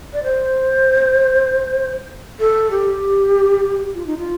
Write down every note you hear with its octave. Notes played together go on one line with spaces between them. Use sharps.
D5
C5
A4
G4
F4
D#4
F4